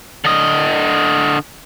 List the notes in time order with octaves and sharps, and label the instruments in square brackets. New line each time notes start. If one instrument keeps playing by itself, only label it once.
[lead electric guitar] D3 D#5